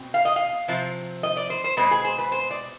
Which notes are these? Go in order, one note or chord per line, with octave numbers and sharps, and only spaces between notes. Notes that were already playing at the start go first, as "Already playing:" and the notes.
Already playing: B2 C4
F5
D#5
F5
C3 F3 C4
D#5
D5
C5
C5
B2 G#3 C4 B4
G#4
C5
B4
C5
D5